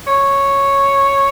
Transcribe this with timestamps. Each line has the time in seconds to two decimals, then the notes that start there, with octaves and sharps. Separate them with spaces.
0.07 C#5